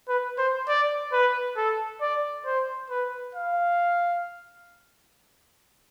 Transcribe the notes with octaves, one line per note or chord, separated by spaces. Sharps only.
B4
C5
D5
B4
A4
D5
C5
B4
F5